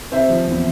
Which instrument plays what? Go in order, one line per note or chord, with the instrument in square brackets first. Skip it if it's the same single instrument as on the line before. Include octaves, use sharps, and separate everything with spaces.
[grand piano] C3 C5 E5
F3
E2